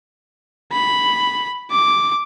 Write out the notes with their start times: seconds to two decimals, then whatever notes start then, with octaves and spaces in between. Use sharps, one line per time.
0.72 B5
1.71 D6